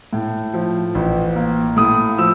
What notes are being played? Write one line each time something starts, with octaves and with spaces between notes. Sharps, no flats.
A2
F3
A1
A#3
A2 D#6
F3 E6